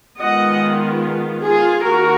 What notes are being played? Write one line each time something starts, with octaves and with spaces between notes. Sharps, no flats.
D#3 G#3 B3 F4 D#5 F#5
F4 G#4
D#3 A#3 F#4 A#4